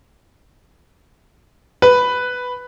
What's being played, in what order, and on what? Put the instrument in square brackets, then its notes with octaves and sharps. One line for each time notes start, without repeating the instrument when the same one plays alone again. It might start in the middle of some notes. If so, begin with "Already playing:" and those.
[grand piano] B4